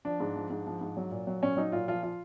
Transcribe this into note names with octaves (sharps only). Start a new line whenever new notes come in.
F3 D4
G#2
F3
G#2
F3
G#2
F#3
A#2
F#3
A#2 C#4
F#3 D#4
A#2 F4
F3 F4
F4